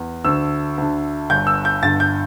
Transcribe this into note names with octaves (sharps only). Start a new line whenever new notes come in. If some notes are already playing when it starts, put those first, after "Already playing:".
Already playing: E2
D2 D3 E6
D2 D3
G1 G2 D3 G6
E6
G6
G1 G2 D3 A6
G6